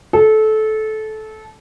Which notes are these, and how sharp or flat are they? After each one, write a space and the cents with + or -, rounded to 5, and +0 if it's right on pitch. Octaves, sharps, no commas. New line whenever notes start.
A4 -20